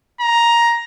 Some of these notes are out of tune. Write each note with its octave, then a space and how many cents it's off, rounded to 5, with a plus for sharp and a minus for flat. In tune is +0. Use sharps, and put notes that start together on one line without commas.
A#5 +10